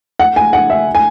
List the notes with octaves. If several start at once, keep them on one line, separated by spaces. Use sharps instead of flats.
F#5
G#5
F#5
E5
G#5